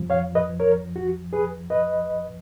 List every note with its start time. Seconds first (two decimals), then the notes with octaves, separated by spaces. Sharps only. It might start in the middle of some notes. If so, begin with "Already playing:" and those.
Already playing: F2 F3
0.10 C#5 F5
0.35 B4 D#5
0.60 A#4 C#5
0.96 F#4
1.33 G#4 B4
1.70 B4 D#5